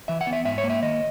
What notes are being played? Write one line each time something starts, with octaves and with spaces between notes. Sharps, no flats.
E3 E5
F#5
B3
E5
G#2 E5
C#5
A#3
E5
D#3 D#5